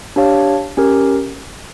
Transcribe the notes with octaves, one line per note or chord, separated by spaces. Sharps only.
D4 G4 C#5 F5 A5
C#4 G4 A#4